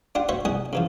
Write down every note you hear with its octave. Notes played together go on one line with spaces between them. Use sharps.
D4 F4 G4 F#5
F#4 C5 C#5 E5 C#6
C2 G3 F#5 G#5 D#6
C#3 E3 F3